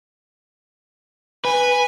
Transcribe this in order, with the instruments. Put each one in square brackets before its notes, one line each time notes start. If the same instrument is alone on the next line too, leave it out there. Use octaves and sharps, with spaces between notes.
[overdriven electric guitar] B4 [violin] G#5